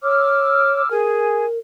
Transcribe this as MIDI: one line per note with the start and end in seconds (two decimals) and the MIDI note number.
0.03 0.82 73
0.03 0.90 86
0.03 0.90 88
0.03 0.90 89
0.90 1.45 68
0.90 1.59 70
0.90 1.45 80